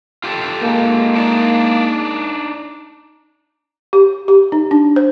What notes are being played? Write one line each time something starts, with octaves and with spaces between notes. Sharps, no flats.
F4 G4 A4
G#3 A#3
D4 D#4 D5
G4
G4
D#4
D4
C5